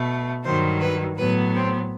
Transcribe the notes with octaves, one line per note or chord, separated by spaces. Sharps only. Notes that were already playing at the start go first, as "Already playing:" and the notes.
Already playing: B2 A3
G2 D#3 F#3 C5
B4
A2 F#3 B3 B4
C4